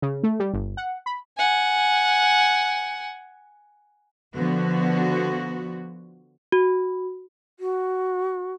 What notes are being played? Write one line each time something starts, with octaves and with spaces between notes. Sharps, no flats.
C#3
A3
G3
G1
F#5
B5
F#5 G#5
D3 F3 B3 F#4
F#4
F#4